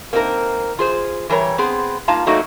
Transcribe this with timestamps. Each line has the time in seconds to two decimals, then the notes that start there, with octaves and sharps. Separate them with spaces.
0.13 A#3 C4 D#4 F#4 A#4
0.79 F4 G#4 C5
1.29 E3 G3 A#4 C#5
1.58 B3 C4 G#4
2.08 A#3 D#4 F4 F5 A5 A#5
2.26 F#3 A3 A#3 D#4 F#4 D#5